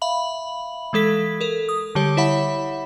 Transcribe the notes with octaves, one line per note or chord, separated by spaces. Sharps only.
E5 F5 B5 F#7
E3 G#3 A4 B6
A4 A#4
D#6
D3 G3 G4 C#5
E4 C#5 E5 F#5 B5